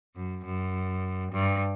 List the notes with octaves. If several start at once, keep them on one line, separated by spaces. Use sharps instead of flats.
F#2
F#2
G2